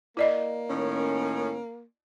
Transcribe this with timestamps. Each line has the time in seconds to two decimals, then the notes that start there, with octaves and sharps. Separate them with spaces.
0.17 A#3 E4 D5 D#5
0.70 A2 D#3 C#4